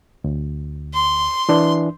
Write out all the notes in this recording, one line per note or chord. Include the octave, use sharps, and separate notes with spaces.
D2
C6
E3 D4